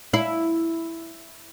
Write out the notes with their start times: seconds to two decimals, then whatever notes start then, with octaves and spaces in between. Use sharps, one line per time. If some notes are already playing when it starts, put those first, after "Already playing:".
0.14 E4